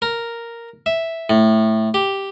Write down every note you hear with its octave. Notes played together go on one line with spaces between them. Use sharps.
A#4
E5
A2
G4